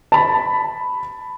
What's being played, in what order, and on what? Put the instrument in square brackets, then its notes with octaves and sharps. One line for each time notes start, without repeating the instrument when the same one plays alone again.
[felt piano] A5 B5